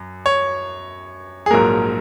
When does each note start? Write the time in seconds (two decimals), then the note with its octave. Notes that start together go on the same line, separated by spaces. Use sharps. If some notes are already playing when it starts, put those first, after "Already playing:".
Already playing: F#2
0.26 C#5
1.46 G#4
1.50 A#1 G#2 F#3 A#3 A#4